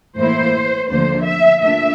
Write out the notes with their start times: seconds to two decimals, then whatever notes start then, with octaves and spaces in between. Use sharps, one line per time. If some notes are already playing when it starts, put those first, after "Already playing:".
0.17 A2 E3 A#3 E4 C5
0.89 D2 D3 F3 A#3 C5
1.25 E5
1.61 A#2 A3 D4 E5